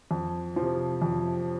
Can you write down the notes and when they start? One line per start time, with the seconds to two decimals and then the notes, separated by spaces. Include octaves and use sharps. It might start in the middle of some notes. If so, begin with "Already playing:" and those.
0.11 F2
0.56 F3
0.61 C3
1.02 F2